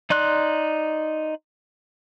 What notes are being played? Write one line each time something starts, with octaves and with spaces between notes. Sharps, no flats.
D#4 D5 C6 F#6